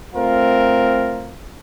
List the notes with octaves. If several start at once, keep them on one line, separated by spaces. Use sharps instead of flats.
A3 C4 F4 A#4